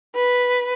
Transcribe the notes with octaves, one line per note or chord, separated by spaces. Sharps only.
B4